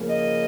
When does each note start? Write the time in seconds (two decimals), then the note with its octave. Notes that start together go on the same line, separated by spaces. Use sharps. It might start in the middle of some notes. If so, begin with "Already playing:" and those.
Already playing: C#3 F3 A#3
0.10 D#5